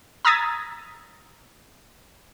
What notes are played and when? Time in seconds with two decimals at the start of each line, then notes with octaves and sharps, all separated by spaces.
0.25 A#5 D#6 E6 G#6 A6 B6